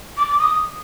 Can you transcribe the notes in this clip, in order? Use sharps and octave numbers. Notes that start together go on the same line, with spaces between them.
D6
D6
D#6